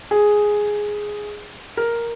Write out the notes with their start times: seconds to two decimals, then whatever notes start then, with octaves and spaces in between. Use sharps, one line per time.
0.11 G#4
1.77 A#4